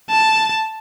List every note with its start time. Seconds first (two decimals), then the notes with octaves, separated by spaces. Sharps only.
0.10 A5